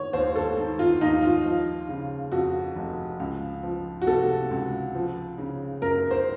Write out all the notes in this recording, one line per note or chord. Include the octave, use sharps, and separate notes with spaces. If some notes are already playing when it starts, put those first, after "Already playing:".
Already playing: D#3 C#5
D#2 C5
A4
D#3
F4
D#2 D#4
F4
F3
C#3
F2 F#4
F1
C#2
F3
F#4
C3 A4
C#2
F3
C#3
F#2 A#4
C5